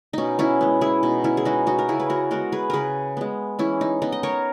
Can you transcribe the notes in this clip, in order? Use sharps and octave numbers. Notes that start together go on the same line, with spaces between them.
B2 C#4 D#4
C#4 E4
G#3 B3
E4 G#4
B2 D#4
C#4 E4
G#4
G#3 B3 D#4 F#4
D#4 F#4
A#4
C#3 E4 G#4
B4
F#4 A#4
G#3 B3 F#4 A#4
G#4 B4
C#3 G#4 A#4 B4
G#3 B3
E3 C#4 E4
D#4
B3 D#4
D#5
A#4 C#5